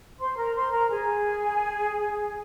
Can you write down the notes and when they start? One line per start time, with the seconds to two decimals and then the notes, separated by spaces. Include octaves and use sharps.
0.19 C5 C6
0.36 A#4 A#5
0.54 C5 C6
0.72 A#4 A#5
0.89 G#4 G#5